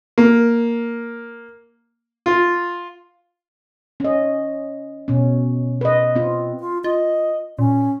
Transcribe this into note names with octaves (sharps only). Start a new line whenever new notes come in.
A#3
F4
C#4 D#5
B2 C#4
B4 D#5
C4 F4
F4
F4 D#5
A#2 C#4